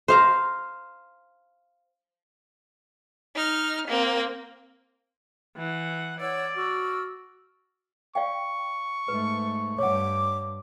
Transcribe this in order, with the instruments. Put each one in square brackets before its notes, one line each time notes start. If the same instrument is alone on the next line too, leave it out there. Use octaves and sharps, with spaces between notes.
[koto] C5 F5 A#5
[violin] D#4 F6
A#3 C4
[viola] E3 F#5
[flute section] C#5 F#5 E6 [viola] D5
[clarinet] F#4 [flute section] E6 F6
[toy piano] D5 F5 G5 [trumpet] C#6
[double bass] G#2 A3 [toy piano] B4
[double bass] G2 [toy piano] C#5 F#5 [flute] D6